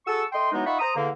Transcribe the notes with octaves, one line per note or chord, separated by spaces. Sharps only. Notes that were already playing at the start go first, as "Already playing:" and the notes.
F#4 G#4 A4 A5 C#6 E6
A3 D#5 G5 C6
E3 F#3 G#3 B3 D#4
D#4 F4 E5 F#5 B5 C#6
C5 A#5 D#6
E2 D3 A#3